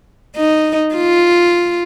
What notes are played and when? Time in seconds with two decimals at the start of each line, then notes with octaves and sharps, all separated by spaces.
0.36 D#4
0.95 F4